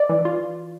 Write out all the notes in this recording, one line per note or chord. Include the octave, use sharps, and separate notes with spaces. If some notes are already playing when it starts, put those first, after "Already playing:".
Already playing: D5
E3
F4